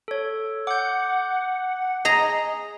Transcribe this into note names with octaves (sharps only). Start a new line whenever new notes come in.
A4 C#5
F#5 D6 G6
G#4 D#5 A#5